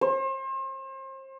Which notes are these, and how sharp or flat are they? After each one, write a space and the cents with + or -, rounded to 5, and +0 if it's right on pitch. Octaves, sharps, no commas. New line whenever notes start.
C5 +35